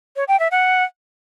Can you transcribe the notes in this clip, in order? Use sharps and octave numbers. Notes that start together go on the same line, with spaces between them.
C#5
G5
E5
F#5